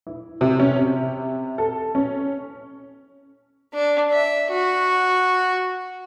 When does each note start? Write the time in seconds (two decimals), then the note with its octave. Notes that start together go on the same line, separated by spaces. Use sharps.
0.07 E4
0.41 C3
0.60 C#4
0.76 C3
1.58 A4
1.95 C#4
3.74 D4
4.11 E5
4.51 F#4